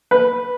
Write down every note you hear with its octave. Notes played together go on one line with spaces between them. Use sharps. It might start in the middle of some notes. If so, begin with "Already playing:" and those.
B4